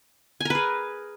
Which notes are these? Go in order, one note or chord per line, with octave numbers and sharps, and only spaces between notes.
G#4 A#4 B4 G#5